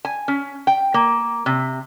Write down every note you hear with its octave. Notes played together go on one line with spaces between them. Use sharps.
G#5
C#4
G5
A#3
C3